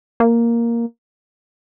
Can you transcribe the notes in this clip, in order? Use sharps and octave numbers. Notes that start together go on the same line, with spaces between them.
A#3